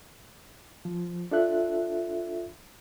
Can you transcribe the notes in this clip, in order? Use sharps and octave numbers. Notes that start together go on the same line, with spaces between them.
F3
D4 F4 A4 E5 F#6